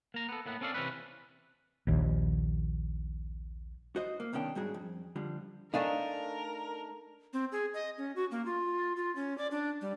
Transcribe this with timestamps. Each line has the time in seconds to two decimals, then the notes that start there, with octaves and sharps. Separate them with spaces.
0.14 A#3 A#5
0.29 B3 A4
0.46 A2 A#3 B3
0.61 C4 C#4 A4 D5 F5
0.74 C3 E3 C4 C#4 B4
1.87 A#1 D#2
3.96 F#4 C5 D#5
4.20 A#3
4.33 C2 B2 D#3 C#4 D4 G5
4.55 G#2 G3 D4 F#4 G#4
4.74 F2
5.16 F2 D3 F3 G3
5.74 A3 D4 D#4 A#4 D5 F5 G#5
7.33 C4
7.52 G#4
7.74 D#5
7.98 C#4
8.16 F#4
8.31 A#3
8.46 F4
8.96 F4
9.16 C#4
9.38 D5
9.51 D4
9.81 G3